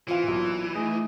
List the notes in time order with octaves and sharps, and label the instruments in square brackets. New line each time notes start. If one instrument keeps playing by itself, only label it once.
[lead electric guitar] E3 [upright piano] C4 F5 [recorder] F4
[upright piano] B1 A#2
[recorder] A3 [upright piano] D#4 G#4